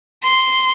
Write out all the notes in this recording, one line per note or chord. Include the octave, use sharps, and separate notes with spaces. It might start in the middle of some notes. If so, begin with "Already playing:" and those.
C6